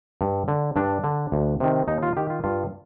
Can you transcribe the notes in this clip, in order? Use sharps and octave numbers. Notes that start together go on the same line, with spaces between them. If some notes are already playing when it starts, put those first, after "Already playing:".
G2
D3
G2 D4
D3
D2
C3 D#3
D#2 D#4
F4
D#3 G4
F4
G2 F4